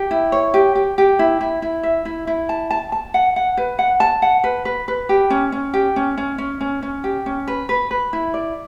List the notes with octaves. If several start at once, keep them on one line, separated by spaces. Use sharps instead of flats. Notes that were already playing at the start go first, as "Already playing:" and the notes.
Already playing: G4
E4
C#5
G4
G4
G4
E4
E4
E4
E5
E4
E4
A5
A5
A5
F#5
F#5
B4
F#5
A5
F#5
B4
B4
B4
G4
C#4
C#4
G4
C#4
C#4
C#4
C#4
C#4
G4
C#4
B4
B4
B4
E4
D5